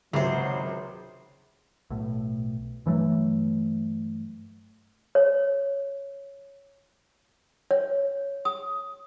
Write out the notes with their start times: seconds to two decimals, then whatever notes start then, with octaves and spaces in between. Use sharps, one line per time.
0.13 C#2 G#2 C3 D#3 F#3 G#4 C5
1.90 B1 A2
2.86 G2 E3 F#3 A3
5.15 C#5
7.71 C#5
8.45 D#6